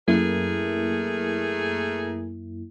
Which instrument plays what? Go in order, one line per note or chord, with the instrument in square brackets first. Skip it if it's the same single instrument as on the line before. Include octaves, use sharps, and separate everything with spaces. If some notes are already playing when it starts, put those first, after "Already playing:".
[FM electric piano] F#2 A#3 E4 [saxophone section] A3 G#4 A#4